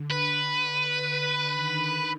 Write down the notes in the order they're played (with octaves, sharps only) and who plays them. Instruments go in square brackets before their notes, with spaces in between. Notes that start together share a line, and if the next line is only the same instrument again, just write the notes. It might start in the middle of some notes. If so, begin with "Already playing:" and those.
Already playing: [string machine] D3
[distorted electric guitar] B4
[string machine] D3
D#3